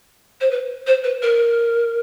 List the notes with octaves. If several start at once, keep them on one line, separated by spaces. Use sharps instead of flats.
C5
B4
C5
B4
A#4